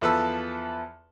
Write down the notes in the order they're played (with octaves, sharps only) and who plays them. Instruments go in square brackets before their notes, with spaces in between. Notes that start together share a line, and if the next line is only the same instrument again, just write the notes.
[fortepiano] E2 F3 A4 B4 A5 E6